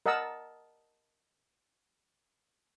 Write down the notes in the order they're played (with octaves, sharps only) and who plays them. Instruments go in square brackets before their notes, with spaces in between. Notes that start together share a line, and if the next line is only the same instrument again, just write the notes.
[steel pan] A#4 D#5 F#5 A5 E6